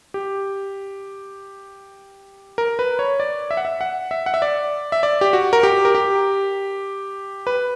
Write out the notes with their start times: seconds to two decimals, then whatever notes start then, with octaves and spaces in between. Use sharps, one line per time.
0.14 G4
2.58 A#4
2.79 B4
2.99 C#5
3.20 D5
3.51 E5
3.57 F#5
3.65 E5
3.81 F#5
4.11 E5
4.26 F#5
4.34 E5
4.42 D5
4.92 E5
5.03 D5
5.21 G4
5.33 F#4
5.53 A#4
5.63 G4
5.85 A#4
5.95 G4
7.47 B4